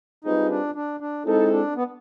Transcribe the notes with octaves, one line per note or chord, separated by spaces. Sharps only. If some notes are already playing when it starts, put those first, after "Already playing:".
G3 C4 D#4 F4 G#4 B4
D4
D4
D4
G#3 C4 D#4 E4 A4
D4
B3